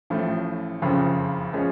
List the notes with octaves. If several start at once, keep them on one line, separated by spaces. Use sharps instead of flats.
A1 A2 F3 A3
F#1 F2 C#3 F3
F3 G#3 C#4